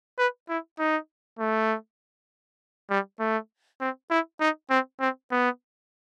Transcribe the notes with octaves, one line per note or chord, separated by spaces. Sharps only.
B4
E4
D#4
A3
G3
A3
C4
E4
D#4
C4
C4
B3